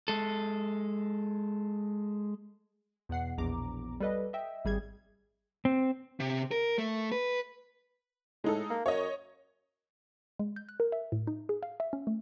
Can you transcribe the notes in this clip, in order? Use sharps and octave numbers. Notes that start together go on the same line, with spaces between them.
G#3 A4
E2 B2 F#5 C7
A#1 E2 B2 A#5 D6
G3 A4 B4 D#5
D#5 E5 G5
G#1 G3 G#4 G#6
C4
C3
A#4
A3
B4
A2 G#3 D#4 A4
A#3
F#2 C#5 D#5
G#3
G6
F#6
A#4
E5
A2
D#4
G#4
F5
E5
C#4
A3